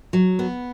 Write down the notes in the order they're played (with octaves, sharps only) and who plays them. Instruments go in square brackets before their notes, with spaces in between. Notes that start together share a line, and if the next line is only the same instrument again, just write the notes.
[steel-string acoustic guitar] F#3
B3